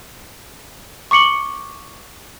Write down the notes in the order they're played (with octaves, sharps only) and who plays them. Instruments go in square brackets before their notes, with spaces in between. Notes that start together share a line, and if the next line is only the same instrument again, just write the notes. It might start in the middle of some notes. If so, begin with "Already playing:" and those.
[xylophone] C#6 D6 C#7 F#7 G7